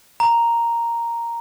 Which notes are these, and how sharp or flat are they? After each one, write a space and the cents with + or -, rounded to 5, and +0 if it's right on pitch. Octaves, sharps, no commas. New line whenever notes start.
A#5 +0